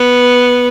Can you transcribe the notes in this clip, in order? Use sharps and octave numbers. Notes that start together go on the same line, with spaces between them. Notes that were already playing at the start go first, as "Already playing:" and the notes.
Already playing: B3